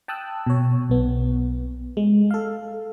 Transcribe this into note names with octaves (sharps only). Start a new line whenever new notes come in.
G5 A5 D#6 E6 F#6
B2 C#5
B1 B3
G#3
A4 F5